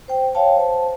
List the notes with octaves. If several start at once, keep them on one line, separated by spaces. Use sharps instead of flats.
C5 G5
C#5 F5 G5 A5
C5 A5